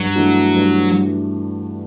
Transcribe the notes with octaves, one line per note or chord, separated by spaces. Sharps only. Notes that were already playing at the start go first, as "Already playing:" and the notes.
Already playing: G2 F#3
E3 A3 D4 F#4
G2